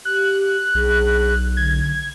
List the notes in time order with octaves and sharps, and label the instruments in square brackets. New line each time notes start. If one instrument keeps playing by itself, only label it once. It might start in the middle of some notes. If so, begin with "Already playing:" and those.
[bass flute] G4 [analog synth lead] F#6
[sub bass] B1 [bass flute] G#4
[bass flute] D3 [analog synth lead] G#6